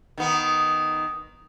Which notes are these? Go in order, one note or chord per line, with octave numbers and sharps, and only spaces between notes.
D#3 B3